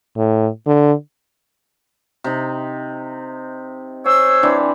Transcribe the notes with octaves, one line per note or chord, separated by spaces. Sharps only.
A2
D3
C3 D#4
C5 C#5 G#5 E6
E3 C4 D4